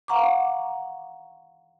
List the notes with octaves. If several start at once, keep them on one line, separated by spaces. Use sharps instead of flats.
F5 F#5 A#5 C#6 D6